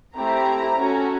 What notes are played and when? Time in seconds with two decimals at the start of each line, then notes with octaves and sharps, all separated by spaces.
0.16 A3 C4 E4 G4 A#5
0.75 C#4 F#4 A4